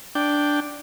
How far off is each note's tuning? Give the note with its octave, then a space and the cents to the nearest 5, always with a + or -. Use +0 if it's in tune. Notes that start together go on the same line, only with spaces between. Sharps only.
D4 +0 G5 +0